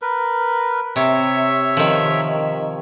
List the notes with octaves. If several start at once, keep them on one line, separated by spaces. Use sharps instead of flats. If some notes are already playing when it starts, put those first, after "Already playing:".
A#4 B4
C3 C#5 E5
D#3 F3